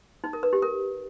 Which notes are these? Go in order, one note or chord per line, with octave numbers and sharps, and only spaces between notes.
D#4
A#4
B4
G4
A#4